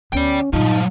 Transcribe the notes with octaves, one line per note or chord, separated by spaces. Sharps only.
D2 B3 C#4 D5 G5
G2 A#2 F#3 D#4 F4